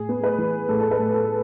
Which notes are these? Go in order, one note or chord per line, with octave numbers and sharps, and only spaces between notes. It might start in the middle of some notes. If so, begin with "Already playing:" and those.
Already playing: A2 G#4
B3
B4
E3
A2 A4
A4
B4
A2
A4